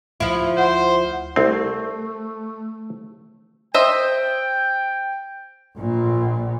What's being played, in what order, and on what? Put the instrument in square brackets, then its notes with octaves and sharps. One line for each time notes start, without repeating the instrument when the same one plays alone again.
[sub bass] D2 [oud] F3 E4
[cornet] C5 [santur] F#5
[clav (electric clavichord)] C2 C4 [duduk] A3
[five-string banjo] C5 D#5 E5 [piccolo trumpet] G5
[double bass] A#1 A#2